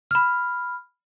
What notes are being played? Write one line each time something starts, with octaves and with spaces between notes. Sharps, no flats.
B5 F6